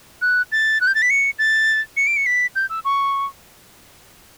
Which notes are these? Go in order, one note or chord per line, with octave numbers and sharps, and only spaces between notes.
F#6
A6
F#6
G6
A6
B6
C#7
A6
C#7
D7
C#7
B6
G6
E6
C#6